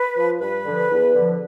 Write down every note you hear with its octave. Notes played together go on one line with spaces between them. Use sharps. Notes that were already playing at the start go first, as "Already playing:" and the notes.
Already playing: B4
F3
G2 B4
D3 F3
E2
D3 F3